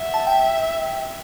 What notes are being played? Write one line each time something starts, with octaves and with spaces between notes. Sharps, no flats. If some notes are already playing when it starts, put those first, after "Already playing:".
Already playing: E5 F#5
A5
G5